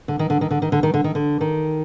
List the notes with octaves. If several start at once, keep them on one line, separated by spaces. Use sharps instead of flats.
D3
D#3
D3
D#3
D3
D#3
D3
D#3
D3
D#3
D3
D#3